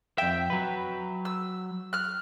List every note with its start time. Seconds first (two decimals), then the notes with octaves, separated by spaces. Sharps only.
0.18 F2 E5 G5
0.50 F#3 B4
1.25 E6
1.93 F6 F#6